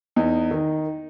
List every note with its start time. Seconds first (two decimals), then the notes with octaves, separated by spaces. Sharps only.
0.16 E2 D#4
0.51 D#3